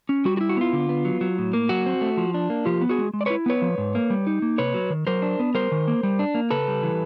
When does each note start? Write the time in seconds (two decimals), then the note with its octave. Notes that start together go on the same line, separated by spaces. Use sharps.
0.09 C#4
0.25 G3 F#4
0.37 F#4
0.41 E4
0.49 F#4
0.57 B3 F4
0.73 D3
0.89 B3
1.05 F#3
1.21 F#3
1.38 A2
1.53 A#3
1.69 F#3 F#4
1.86 C4
2.01 A3
2.17 F3
2.34 D4
2.50 A#3
2.66 F3 F4 G4
2.81 B3
2.89 F#4 G#4
2.99 G#3
3.14 G#3
3.21 D5
3.26 B4 C#5
3.30 E4
3.46 B3 B4 C#5
3.62 F3
3.78 G#2
3.95 A#3
4.10 G3
4.27 D#4
4.42 A#3
4.58 C3 B4 C#5
4.74 F#3
4.90 D#3
5.07 F#3 A#4 C5
5.22 D4
5.39 B3
5.55 G3 A#4 C5
5.72 D#3
5.88 A#3
6.03 G3
6.19 D4
6.35 A#3
6.50 C#3 A4 B4
6.68 G3
6.83 E3